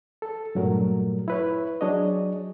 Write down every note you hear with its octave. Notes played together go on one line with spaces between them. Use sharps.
A4
G2 A#2 F#3 A3 A#4
E4 B4 C#5
F#3 D4 G#4 C#5 D#5